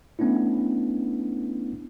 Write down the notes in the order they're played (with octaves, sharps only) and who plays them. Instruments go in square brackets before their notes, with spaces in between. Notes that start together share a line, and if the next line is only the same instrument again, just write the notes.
[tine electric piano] A3 B3 C#4 D4 E4